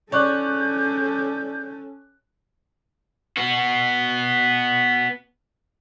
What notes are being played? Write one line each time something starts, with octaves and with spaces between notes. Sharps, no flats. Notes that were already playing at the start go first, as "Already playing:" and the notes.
C#4 A4 C#5 D5 F#6 G6
B3 F#4